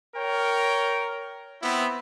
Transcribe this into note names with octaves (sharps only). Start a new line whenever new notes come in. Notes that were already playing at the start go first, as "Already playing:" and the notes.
A#4 C#5 G5
B3 C4 E4